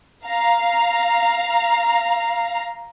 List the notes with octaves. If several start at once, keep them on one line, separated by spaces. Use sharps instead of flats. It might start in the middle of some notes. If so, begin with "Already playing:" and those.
F5 A#5